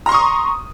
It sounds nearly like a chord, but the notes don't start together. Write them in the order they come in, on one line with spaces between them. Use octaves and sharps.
A#5 C6 C#6 D#6